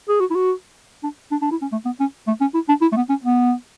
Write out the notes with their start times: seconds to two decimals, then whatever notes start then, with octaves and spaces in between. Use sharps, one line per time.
0.09 G#4
0.20 F#4
0.30 E4
0.35 F#4
1.03 D4
1.32 D4
1.42 D4
1.51 E4
1.62 C#4
1.72 A3
1.85 B3
2.00 C#4
2.27 A3
2.41 C#4
2.54 E4
2.69 D4
2.82 E4
2.92 A3
2.96 B3
3.10 C#4
3.24 B3